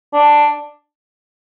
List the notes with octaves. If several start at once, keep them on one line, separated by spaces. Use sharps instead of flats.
D4